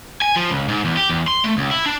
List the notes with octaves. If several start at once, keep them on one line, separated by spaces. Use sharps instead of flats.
G#5
F3
C#2
G#2
E2
G4
E2
C6
A3
C#2
E4
D4